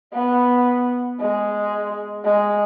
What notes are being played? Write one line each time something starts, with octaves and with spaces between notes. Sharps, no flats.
B3
G#3
G#3